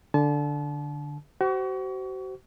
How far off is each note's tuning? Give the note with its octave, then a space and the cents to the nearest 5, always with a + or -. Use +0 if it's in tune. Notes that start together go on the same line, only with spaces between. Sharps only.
D3 +0 A5 -35
F#4 +40 C5 -15 C#6 +35